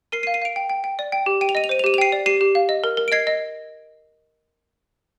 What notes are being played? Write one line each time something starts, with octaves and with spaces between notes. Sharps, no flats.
A#4 C7 D#7
C7 D#7
F5
C7 D#7
F5 D7 F7
G5
G5
G5
D5
G5
G4
G5 D#7
F7
D#5 D#7
F7
C5 D#7
F7
G4 D#7
F7
G5 C7 D#7
D5
G4 C7 D#7
G4
F5
D#5
A#4
A#4
D7
D#5 G#6 C7
D#5